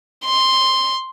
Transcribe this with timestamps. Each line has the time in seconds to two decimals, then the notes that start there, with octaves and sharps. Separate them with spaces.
0.24 C6